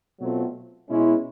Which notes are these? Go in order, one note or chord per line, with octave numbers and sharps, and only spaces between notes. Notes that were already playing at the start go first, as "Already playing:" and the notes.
B2 F#3 A3 C4 F4
B2 G#3 C#4 E4